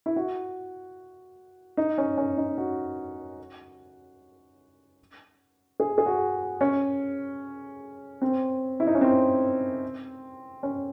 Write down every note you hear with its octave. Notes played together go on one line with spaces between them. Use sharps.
E4
F#4
D#4
C#4
C#4
D#4
F#4
G#4
G#4
F#4
C#4
C4
E4
D#4
C#4
C4
C#4